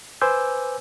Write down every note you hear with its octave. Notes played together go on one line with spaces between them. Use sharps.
B4 C5 G#5 D6 E6 G6